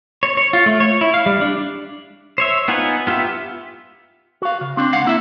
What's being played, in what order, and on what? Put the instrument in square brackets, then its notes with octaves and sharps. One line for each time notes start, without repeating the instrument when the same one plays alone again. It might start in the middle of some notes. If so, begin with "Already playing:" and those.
[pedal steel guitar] C#5
C#5
F4
A3
C#5
E4
F5
G3
D4
C5 C#5 E5
B3 D#4 F4 F#5 G#5
B3 F4 G4 E5
[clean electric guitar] F#4 F5
C#3
C4 D4
C#2 F5 F#5
A#3 E4 E5